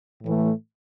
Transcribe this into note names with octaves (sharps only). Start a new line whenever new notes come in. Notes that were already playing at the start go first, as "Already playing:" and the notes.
A2 E3 A3